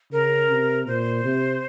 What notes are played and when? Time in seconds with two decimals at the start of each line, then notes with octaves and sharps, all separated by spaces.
0.12 C#3 A#4
0.49 C3
0.87 A#2 C5
1.24 C3